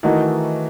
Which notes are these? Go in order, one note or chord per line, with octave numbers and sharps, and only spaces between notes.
D#3 E3 A3 D#4 F#4